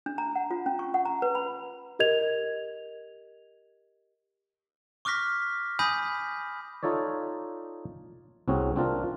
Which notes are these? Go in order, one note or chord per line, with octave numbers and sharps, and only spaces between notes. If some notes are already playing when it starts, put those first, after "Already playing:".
D4
A#5
F#5
F4
C#4
C#6
F#5
A#5
B4
B5
G4 A#4 D#5 G#6 F7
C#6 D6 F6 F#6 A#6 B6
G#5 B5 D#6 G6 A#6 B6
D#4 F4 A4 C#5 D5
C2 C4 C#4 F#4 G#4
C4 D4 F4 A#4